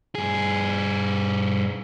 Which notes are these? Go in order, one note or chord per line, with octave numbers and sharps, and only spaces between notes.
G2 G#4